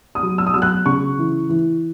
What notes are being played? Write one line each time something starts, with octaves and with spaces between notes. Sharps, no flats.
D#6
F#3
E6
D#6
F#3 E6
F#6
C#3 C#6
E3
E3